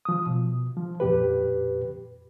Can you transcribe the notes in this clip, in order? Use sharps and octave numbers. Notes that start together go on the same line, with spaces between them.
F3 D#6
B2
F3
F2 A#2 G4 B4